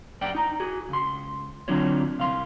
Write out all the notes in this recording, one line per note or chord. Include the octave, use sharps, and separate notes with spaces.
F#2 D5 F#5 G5
D#4 A#5
F#4 G#4
C#2 C6
D3 F#3 C4 D4 F4 C#5
C2 F5 C6